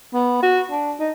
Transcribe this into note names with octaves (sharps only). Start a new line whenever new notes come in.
B3
F#4
D4
D#4